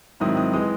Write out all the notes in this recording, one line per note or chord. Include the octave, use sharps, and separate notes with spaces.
G#2 D#3 F#3 C4 E4 D#6
D#6
E3 G#3 D#6